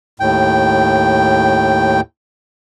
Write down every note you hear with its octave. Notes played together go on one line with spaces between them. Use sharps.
D#2 A2 G5